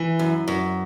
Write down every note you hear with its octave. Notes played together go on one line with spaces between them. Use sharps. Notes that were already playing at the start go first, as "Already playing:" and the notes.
Already playing: E3
F#2
F#2